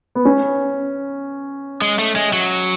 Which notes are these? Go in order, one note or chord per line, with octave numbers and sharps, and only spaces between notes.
B3
C#4
G#3
A3
G#3
F#3